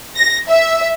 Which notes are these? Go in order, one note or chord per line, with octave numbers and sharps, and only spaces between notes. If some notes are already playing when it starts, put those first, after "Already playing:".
A#6
E5